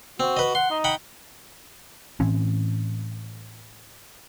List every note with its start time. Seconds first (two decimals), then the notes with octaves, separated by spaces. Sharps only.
0.20 C4 F#4
0.37 B4 D#5
0.55 F#5 C6
0.70 D#4
0.84 F#5 G5 B5
2.20 A2 E3 C4 C#4